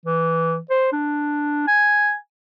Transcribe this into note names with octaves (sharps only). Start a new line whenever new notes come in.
E3
C5
D4
G#5